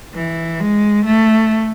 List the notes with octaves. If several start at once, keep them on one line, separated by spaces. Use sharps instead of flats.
E3
G#3
A3